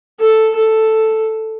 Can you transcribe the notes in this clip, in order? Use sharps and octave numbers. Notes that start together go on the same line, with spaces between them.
A4
A4